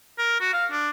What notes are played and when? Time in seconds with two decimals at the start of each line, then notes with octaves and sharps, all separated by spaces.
0.18 A#4
0.40 F#4
0.53 F5
0.71 D4